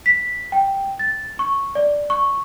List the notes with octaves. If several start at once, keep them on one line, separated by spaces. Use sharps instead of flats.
B6
G5
A6
C#6
D5
C#6